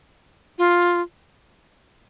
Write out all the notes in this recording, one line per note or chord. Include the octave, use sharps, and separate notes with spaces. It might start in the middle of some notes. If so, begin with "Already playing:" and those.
F4